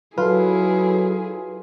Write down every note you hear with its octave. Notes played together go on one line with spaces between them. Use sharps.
F#3 E4 F4 G#4 A4 B4